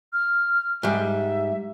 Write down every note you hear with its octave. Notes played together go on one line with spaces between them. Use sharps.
F6
G#2 G3 E5